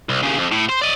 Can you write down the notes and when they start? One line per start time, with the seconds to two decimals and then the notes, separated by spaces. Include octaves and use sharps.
0.09 C2
0.23 D#2 C#3
0.38 F2
0.52 A2
0.69 C5
0.82 D5 D#5